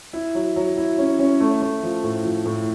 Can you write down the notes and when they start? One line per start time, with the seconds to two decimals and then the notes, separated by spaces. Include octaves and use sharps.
0.13 E4
0.35 F#3
0.56 F#3
0.77 E4
0.98 C#4
1.19 C#4
1.40 A3
1.62 A3
1.83 F3
2.04 A2
2.25 F3
2.46 A2